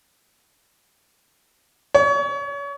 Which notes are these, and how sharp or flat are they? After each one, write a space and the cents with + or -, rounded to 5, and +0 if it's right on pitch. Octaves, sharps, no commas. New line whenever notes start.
C#5 +30